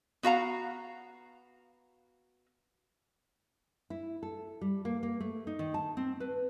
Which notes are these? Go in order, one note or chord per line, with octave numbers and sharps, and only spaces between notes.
B3 F#4 F5 A#5
E4
A4
G3
A#3
A#3
A3
D#4
D#3
A5
C4
B4